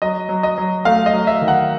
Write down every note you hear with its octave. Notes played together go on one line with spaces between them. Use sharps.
F#3 D#5
F#3
D#5
F#3
A3 F5
D#5
F#3
E5
D#3
F#5